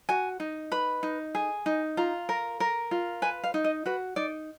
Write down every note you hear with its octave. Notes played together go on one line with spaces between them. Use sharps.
F#4 G#5
D#4
B4 B5
D#4
G#4
D#4
F4 A#5
A#4
A#4
F4
B4 G#5
F5
D#4
D#5
F#4 B4
D#4 D5